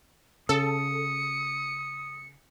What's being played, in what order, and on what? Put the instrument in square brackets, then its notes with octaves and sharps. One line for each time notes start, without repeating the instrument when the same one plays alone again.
[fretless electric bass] C#3 [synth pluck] A4 [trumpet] D#6 [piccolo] C#7